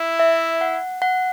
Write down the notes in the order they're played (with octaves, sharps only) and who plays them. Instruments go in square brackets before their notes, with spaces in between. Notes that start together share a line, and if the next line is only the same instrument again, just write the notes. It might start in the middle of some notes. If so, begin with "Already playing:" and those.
Already playing: [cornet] E4
[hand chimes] E5
F#5
F#5